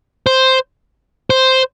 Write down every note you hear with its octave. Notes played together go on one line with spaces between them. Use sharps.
C5
C5